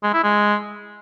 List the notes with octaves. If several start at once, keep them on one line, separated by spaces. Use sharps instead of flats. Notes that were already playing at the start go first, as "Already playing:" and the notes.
G#3
E4
G#3